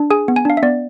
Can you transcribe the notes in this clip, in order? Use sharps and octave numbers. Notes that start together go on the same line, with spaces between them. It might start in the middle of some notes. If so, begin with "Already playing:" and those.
Already playing: D4
G#4 G#5
B3
G#5
D4 F5
E5
B3 D5